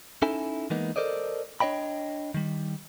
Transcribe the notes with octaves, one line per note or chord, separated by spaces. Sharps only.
C#4 D#4 E4 A4 G#5
E3 G#3 A#3 B3 D#4
A4 A#4 C5 D5 D#5
D4 C#5 D#5 G5 B5
D#3 G3